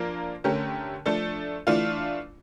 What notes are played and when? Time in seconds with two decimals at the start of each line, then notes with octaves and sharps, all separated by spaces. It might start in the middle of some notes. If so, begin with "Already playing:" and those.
Already playing: F3 A#3 D4 F4 A#4
0.44 D3 A3 C#4 G4 A#4
1.06 F3 A3 D4 A4
1.67 E3 A3 D4 F4